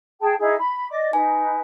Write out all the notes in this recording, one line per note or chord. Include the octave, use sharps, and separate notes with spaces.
G#4 G5 A5
D#4 E4 G#4
B5
D5 D#5 D6
D#4 B4 G#5